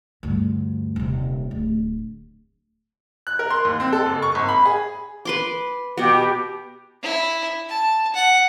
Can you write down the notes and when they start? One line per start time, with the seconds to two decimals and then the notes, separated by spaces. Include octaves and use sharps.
0.23 D2 G2
0.96 D#1 C3
1.51 D1
3.27 F#6
3.39 A#4
3.51 C6
3.65 D#2
3.80 C4
3.93 A4
4.06 F#1
4.22 C#6
4.35 G#1
4.49 B5
4.65 G#4
5.25 B4 C6 D6
5.97 B2 B3 G4
7.02 E4
7.69 A5
8.14 F#5